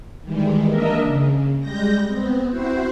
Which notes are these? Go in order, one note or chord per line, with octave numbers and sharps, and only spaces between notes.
D#3 E3 G3 G#3
A#3 D4 A#4 D#5 E5
C#3
G3 G#3 G6 A#6
B3 C4
C4 E4 F#4 C5